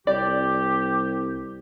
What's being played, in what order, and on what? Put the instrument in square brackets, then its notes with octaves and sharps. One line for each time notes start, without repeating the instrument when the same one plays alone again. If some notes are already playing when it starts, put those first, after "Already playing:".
[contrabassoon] C2 [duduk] G4 [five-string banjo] D5